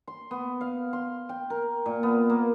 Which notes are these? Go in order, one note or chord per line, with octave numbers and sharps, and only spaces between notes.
C6
B3
F5
C6
G5
A#4
A#2
B3
A#3